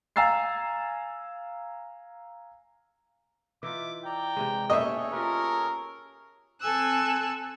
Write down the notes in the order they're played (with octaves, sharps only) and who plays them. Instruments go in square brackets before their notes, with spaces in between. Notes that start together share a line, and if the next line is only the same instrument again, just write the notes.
[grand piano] F5 G#5 A#5 E6 A6 C7
[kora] E3 D#4 F4 [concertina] E5 [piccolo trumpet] D6
[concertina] D5 A#5 [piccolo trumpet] G5
[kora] C3 E3 G#3
[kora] A#3 B3 C#4 [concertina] G#4 A4 C#5 [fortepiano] D#5 E5
[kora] F4 G4 [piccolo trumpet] A#4
[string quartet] C4 A4 G#5 E6 F#6